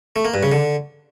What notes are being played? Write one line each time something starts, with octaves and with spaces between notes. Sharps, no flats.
A3
A#3
G2
C#3
D3